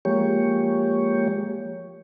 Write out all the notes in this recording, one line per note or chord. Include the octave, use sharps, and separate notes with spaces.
F3 G#3 A#3 G4 C#5